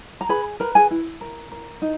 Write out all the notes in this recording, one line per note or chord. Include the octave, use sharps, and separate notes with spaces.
A#5
G#4 B4 B5
A#4 B4 A#5
G#4 G#5
E4
A#4
A#4
D#4